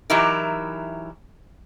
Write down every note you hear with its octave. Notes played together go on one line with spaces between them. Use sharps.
E3 F#3 D#4 E4 G4 A#4